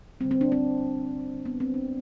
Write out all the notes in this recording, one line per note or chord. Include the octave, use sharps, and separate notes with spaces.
D3 G3 C4
C4
D4
C4
B3
C4
D4